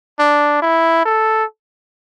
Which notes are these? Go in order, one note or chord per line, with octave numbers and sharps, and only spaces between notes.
D4
E4
A4